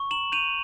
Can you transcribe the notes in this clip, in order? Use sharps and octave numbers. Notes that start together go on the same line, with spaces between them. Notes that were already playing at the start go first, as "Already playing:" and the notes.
Already playing: C#6
A#5 E7 F#7
G6 D#7 F7